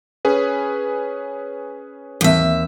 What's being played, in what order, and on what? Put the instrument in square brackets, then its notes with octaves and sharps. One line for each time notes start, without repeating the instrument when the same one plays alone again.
[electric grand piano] C#4 G#4 B4
[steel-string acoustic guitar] D#2 E5 [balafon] E3 C4